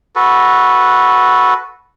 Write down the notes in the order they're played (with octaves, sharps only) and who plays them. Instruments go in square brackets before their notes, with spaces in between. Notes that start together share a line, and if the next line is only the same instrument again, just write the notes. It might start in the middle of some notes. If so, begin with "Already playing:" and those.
[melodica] F#4 A4 B4